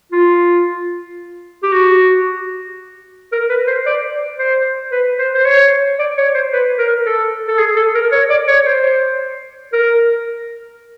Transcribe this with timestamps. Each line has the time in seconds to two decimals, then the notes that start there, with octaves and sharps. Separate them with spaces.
0.12 F4
1.63 G4
1.72 F#4
3.32 A#4
3.49 B4
3.67 C5
3.86 D5
4.39 C5
4.92 B4
5.19 C5
5.34 C5
5.45 C#5
5.99 D5
6.17 C#5
6.34 C5
6.53 B4
6.78 A#4
7.06 A4
7.48 A4
7.58 G#4
7.76 A4
7.95 A#4
8.12 C#5
8.30 D5
8.48 C#5
8.66 C5
9.73 A#4